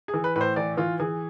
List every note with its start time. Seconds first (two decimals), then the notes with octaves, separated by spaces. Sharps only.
0.08 G#4
0.14 E3
0.24 B4
0.35 A2 B4
0.41 C5
0.56 E3 D5
0.77 E3 F4
1.00 E3 G#4